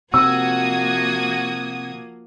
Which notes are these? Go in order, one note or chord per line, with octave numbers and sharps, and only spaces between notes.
C3 F3 A#3 F#4 D#6 E6 G#6